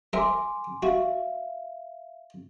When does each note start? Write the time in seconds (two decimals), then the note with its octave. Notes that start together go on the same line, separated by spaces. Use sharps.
0.13 A#4 E5 G#5 C6 D6
0.83 F#4 E5 F5